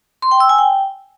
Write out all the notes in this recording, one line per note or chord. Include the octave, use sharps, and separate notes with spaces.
C6
G5
E6
G#5
G5